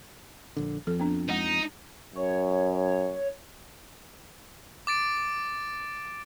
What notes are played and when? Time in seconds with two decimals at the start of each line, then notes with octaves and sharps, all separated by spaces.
0.57 A#1 D3
0.87 F2 F3 A4
1.00 B3 D4
1.29 G#3 D#4 F#5
2.16 F#2 C#5
4.87 D6 A6 D7